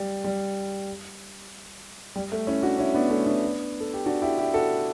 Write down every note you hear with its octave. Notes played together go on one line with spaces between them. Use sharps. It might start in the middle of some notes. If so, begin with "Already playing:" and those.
Already playing: G3
G3
G3
A3
C#4 E4
D4 F#4
C#4 E4
B3 D4
A3 C#4
B3 D4
A4
G4
D4 F#4
E4 G4
E4 G4
F#4 A4